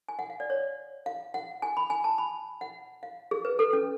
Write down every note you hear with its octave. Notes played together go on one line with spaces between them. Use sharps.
G#5
F#5
F5
D5
C#5
F5
F#5
G#5
B5
G#5
A5
B5
F#5
F5
G#4
B4
A4
C#4